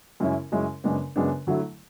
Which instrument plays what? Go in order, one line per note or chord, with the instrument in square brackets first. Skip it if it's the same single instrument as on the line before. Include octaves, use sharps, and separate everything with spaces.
[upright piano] F#2 C#3 G#3 C#4 E4
F#2 C#3 G#3 C#4 E4
F#2 C#3 G#3 B3 D4
F#2 C#3 G#3 B3 D4
D3 F#3 A3 E4